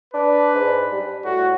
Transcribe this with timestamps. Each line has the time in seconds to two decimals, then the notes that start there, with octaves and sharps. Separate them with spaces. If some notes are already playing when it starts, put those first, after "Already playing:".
0.14 D4 B4
0.54 G#2
0.91 G3
1.25 A2 F#4